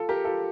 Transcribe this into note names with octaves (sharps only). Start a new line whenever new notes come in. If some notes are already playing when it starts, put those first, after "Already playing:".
Already playing: F4 A4
G4 A#4
F4 A4